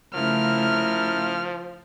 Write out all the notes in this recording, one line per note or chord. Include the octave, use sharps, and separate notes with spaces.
C#3 F3 A3 E4 A#4 F6